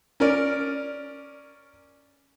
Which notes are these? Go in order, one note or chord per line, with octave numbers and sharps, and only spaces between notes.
C#4 A#4 D5